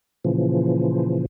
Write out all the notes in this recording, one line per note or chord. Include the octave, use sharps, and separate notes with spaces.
A#2 C#3 E3 F3